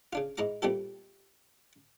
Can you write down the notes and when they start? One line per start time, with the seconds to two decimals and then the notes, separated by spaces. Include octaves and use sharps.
0.13 C#3 D4 F4
0.37 G#2 D#4 E4 A#5 D6
0.62 A#2 G3 C4 E4 G4 A4